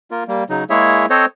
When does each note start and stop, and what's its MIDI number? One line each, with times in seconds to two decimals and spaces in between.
0.11 0.24 58
0.11 0.24 65
0.11 0.24 70
0.28 0.44 55
0.28 0.44 58
0.50 0.64 49
0.50 0.64 54
0.50 0.64 63
0.70 1.06 56
0.70 1.06 58
0.70 1.06 64
0.70 1.06 68
0.70 1.06 73
0.70 1.06 76
1.10 1.25 60
1.10 1.25 69
1.10 1.25 72
1.10 1.25 73
1.10 1.25 75